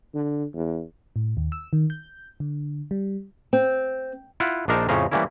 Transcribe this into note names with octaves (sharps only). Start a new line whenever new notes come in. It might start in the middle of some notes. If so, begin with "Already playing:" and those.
D3
E2
A2
D#2
E6
D#3
G6
D3
G3
C4
E4 F4 F#5
A#1 D4 D#4 A#4 C5 A5
F2 A2 C#3 C#4 C5 A#5
E3 G3 A3 A#3 C#4 E4